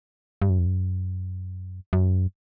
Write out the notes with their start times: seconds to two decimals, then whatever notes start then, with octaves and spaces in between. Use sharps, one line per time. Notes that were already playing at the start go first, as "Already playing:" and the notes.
0.42 G2
0.50 F#2
0.59 F2
0.66 F#2
1.93 F#2